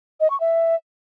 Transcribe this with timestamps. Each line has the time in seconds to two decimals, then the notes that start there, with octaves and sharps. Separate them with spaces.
0.20 D#5
0.30 C#6
0.40 E5